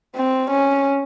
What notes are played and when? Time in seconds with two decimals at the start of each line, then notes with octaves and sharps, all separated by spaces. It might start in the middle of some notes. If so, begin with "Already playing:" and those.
0.16 C4
0.50 C#4